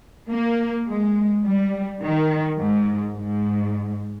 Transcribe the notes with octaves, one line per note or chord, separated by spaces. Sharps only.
A#3
G#3
G3
D#3
G#2
G#2